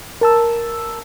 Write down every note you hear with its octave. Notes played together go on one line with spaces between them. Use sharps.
A#4 A5 E6